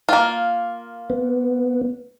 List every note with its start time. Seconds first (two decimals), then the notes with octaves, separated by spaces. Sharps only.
0.09 A#3 F4
1.10 B3